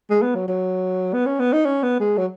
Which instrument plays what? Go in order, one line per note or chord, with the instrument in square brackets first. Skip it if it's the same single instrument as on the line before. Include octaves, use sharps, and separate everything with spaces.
[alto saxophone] G#3
B3
F#3
F#3
B3
C#4
B3
D#4
C#4
B3
G#3
F#3